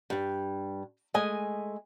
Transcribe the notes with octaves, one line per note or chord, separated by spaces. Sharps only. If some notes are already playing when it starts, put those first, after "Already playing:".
G2 G3
G#3 A3 D#5 G#5